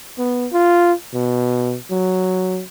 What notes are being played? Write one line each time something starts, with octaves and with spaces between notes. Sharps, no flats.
B3
F4
B2
F#3